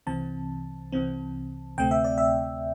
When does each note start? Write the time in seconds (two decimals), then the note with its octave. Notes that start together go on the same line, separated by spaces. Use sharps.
0.07 C2 C3 E3 C4 A5
0.92 C2 C3 E3 C4
1.77 D2 C3 A3 C4 G5
1.91 E5
2.04 D5
2.18 E5